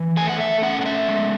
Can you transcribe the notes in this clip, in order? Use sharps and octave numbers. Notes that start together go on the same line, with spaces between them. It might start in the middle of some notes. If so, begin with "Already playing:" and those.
Already playing: E3
A3 G#5
F#5
E5
C#4 F#5
F#5
E5
G#3